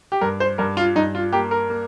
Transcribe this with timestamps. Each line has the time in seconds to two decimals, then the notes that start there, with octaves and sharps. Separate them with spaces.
0.12 G4
0.21 G2 A#4
0.40 C5
0.58 G2 A#4
0.77 F4
0.95 G2 D#4
1.15 F4
1.32 A#3 G4
1.51 A#4
1.70 A#3